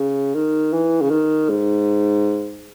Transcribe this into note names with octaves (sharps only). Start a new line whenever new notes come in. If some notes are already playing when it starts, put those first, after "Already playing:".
Already playing: C#3
D#3
E3
C#3
D#3
G#2